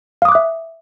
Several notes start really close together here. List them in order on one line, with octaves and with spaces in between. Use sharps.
F5 D#6 D6 F#6 E5